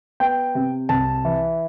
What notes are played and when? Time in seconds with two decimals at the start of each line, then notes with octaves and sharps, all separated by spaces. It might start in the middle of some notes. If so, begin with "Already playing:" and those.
0.20 B3 G5
0.55 C3
0.89 C2 A5
1.25 E3